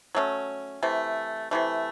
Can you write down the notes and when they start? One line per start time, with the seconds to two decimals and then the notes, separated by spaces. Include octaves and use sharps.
0.15 F#3 A3 C#4
0.83 C3 E3 A3
1.51 C3 E3 A3